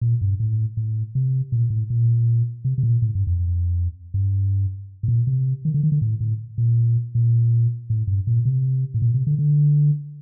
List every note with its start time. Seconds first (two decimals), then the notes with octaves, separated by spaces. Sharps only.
0.01 A#2
0.21 G2
0.40 A2
0.77 A2
1.15 C3
1.52 A#2
1.70 A2
1.90 A#2
2.65 C3
2.78 C3
2.83 A#2
3.02 A2
3.15 G2
3.27 F2
4.14 G2
5.03 A2
5.08 A#2
5.27 C3
5.65 D#3
5.74 D3
5.83 D#3
5.92 D3
6.02 A2
6.20 A2
6.58 A#2
7.15 A#2
7.90 A2
8.07 G2
8.27 A#2
8.45 C3
8.94 A2
9.02 A#2
9.14 C3
9.27 D3
9.39 D3